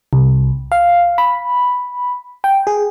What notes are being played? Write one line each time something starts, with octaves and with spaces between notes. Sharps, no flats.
C2
F5
B5
G5
G#4